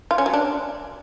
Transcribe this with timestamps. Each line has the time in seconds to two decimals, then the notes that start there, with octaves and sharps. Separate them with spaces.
0.11 F4
0.18 C#4
0.26 F#3
0.34 D4